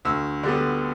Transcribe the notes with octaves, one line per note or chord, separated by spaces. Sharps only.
D2 E6
D3 G3 B3